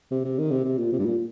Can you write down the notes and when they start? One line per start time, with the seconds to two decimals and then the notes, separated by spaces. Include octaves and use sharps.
0.11 C3
0.25 C3
0.38 D#3
0.51 C3
0.64 C3
0.78 A#2
0.92 C3
0.99 G2
1.06 A#2